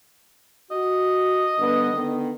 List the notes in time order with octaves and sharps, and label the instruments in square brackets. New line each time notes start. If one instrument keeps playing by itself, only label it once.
[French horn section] F#4 [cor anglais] D#5
[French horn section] G2 D3 B3
D3 D#3 B3